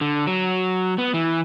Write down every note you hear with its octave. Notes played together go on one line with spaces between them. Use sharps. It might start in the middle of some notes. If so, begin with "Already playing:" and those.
D3
F#3
B3
E3